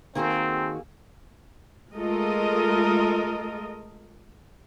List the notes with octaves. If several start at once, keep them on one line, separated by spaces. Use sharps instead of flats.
D#3 A#3 C4 F#4 G#4 A4
G#3 A3 F4 A4 A#4 D#5